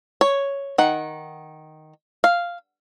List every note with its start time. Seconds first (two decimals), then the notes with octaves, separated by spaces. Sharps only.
0.21 C#5
0.78 D#3 F#5
2.24 F5